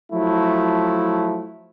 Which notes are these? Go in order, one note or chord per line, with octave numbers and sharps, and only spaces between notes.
F3 F#3 A3 E4